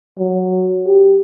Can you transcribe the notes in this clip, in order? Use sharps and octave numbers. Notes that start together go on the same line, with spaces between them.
F#3
G4